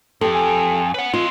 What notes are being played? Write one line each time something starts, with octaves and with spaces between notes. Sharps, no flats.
F2 G4 A4
G#5
C#4 B4 F#5
D#2 C4 F4 D#5